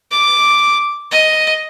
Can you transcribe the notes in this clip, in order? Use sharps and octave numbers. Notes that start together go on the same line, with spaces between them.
D6
D#5